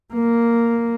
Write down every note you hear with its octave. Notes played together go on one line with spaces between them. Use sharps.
A#3